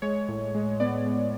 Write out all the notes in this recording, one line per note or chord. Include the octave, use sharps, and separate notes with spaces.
G#3 C#5
A2
G#3
B3 D5
G#3